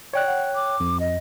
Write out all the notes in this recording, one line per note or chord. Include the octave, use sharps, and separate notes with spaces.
C#5 D5 G5 F#6
F#5
D6
F2
D#5